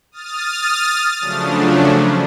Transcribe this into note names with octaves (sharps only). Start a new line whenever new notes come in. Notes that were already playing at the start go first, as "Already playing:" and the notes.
D#6 F6 A6
C#3 F3 F#3 A3 D4